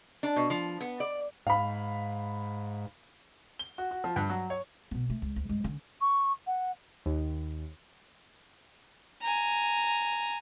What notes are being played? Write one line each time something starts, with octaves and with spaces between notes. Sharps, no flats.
D4
B2
F3
B3
D5
G#2 F5 B5
G7
F#4
F#4
F3
G2
F#3
C#5
B2 B3
A3
C#2
D2
G2 G#3
D3 C#4
C#6
F#5
D#2
G#5 A#5